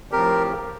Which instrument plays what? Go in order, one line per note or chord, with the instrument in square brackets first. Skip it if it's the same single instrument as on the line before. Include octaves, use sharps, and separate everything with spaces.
[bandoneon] A2 F3 C4 G4 [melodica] A#4